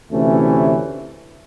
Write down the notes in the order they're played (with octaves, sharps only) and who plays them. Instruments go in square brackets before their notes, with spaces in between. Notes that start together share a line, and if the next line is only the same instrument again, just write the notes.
[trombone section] D2 C3 E3 A3 C#4